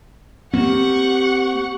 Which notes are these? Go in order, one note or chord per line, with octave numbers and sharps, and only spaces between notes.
A#3 C4 G4 F#5 C#6